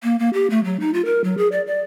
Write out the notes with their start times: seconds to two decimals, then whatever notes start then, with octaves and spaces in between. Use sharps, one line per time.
0.03 A#3
0.19 A#3
0.34 G4
0.50 A3
0.64 F#3
0.80 D#4
0.94 F4
1.05 A#4
1.24 F#3
1.38 G#4
1.52 D5
1.67 D5